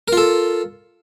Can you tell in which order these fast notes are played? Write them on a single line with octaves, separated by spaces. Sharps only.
A#4 F4 A4